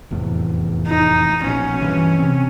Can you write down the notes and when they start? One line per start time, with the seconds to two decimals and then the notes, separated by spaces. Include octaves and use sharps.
0.11 F1 E2 A2
0.87 D#4
1.43 A#1 B2 C#4
1.82 G2 E3
2.19 C3 C4